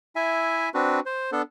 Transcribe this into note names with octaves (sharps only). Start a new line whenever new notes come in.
E4 E5 G#5
C4 D4 F#4 B4
C5
B3 D4 A4